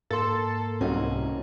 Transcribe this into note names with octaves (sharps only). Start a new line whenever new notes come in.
G#2 A#3 A4 C6
C2 C#4 D#4 F#4